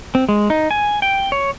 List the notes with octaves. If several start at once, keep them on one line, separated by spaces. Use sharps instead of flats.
C4
G#3
D#4
G#5
G5
C#5